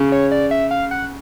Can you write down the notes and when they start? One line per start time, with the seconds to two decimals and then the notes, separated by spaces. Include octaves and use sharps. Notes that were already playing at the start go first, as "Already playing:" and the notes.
Already playing: C#3
0.12 C#5
0.32 D5
0.51 E5
0.71 F5
0.91 F#5